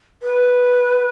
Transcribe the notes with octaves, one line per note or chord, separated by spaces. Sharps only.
B4